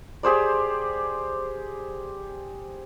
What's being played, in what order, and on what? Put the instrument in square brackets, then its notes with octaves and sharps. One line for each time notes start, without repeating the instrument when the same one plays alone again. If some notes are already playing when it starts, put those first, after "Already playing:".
[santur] G4 G#4 C5 D5